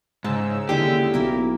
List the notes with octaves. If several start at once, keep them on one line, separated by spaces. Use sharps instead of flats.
G#2 C#3 A5 E6
D#2 D3 G#3 E4 G4
B1 A#3 E4 A#4